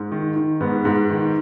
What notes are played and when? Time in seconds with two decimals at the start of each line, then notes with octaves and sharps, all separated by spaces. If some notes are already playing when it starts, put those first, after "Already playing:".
Already playing: G#2
0.12 D#3
0.36 D#3
0.60 G#2 B3
0.85 G#2
1.10 D#3